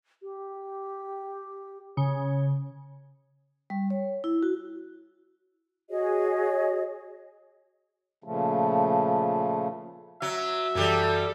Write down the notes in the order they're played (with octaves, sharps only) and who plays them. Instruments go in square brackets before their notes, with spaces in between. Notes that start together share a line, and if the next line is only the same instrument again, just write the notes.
[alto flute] G4
[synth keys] C#3 [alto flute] C#5
[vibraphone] G3
C#5
E4
F#4
[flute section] F#4 G#4 C#5 D#5
[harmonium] A#2 C#3 F3 A3
[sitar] F#3 [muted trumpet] E5
[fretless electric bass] F#2 E3 [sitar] F#3 G3 [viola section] A4